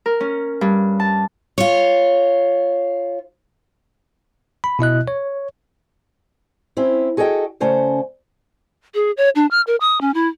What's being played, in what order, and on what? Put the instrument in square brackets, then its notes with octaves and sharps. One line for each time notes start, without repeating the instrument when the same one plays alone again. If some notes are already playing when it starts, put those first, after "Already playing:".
[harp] A#4
C#4
G2
A5
[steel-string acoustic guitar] F4 C#5
[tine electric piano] B5
B2 E4 D#5 F#6
C#5
[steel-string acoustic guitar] C4 C#4 E4
F#4 G#4 A4 D#5 G5
C#3 A3 C#4 C5 D5
[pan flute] G#4
C#5
D4
F6
A#4
D#6
C#4
E4